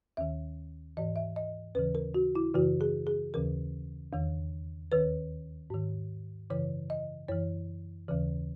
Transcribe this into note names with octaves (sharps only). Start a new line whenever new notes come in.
D#2 D#3 E5
G#2 E3 D#5
E5
D#5
D#2 C#3 E3 B4
A#4
F#4
E4
F#2 C#3 E3 F#4
G#4
G#4
D#2 C#3 E3 A#4
E2 D#3
D#2 D#3 B4
G#2 D#3
F#2 C#3 E3 C#5
D#5
F#2 E3 C#5
D#2 C#3 E3